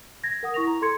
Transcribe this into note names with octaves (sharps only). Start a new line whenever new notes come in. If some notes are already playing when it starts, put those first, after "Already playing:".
G#6 A#6
A#4 F#5 D#6
E4 C#6 A#6 F7
A#5
A4 C6 G#6 C#7